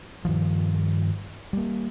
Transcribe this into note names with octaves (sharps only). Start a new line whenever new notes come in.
G2 D#3 F3
G3 A#3